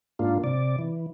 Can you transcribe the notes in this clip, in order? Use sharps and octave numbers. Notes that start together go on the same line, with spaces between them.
G#2 A#3 D4 F4
C3 D5
E3